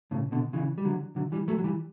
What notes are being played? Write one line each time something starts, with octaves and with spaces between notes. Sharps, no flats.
A2 C#3
B2 D3
C#3 E3
G3
D3 F#3
D3 F#3
E3 G3
F#3 A3
F#3
E3 G3